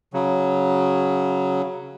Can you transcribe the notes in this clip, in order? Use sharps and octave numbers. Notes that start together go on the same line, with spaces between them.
C#3 F#3